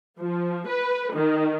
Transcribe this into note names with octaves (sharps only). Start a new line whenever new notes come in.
F3
B4
D#3